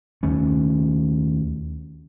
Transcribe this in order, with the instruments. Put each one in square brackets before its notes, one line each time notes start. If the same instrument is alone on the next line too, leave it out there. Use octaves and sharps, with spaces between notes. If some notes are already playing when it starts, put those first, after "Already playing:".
[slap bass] D#2 D#3 A3 C#4